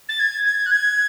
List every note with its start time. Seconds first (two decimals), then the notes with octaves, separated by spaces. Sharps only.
0.09 A6
0.20 G#6
0.45 G#6
0.66 F#6
0.71 G#6